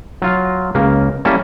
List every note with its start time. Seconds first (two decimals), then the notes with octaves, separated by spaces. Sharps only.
0.22 F#3 F4 F5
0.75 C#2 C#3 A#3
1.25 G3 A#3 C#4 E4 A4